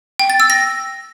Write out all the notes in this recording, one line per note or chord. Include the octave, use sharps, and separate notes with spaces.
G5
A6
E6
A#6